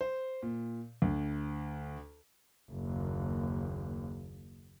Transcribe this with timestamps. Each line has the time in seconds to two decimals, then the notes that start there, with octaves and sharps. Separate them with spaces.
0.01 C5
0.42 A#2
1.02 D2
2.71 F#1 D#2